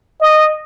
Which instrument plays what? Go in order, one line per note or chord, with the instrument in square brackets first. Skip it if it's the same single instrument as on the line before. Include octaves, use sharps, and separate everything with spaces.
[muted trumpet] D#5